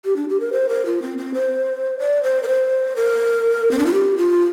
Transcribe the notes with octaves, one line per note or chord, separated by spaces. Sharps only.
G4
D4
G4
A#4
C5
A#4
F4
C4
C4
C5
D5
C5
A#4
C5
A#4
C4
D4
F4
G4
F4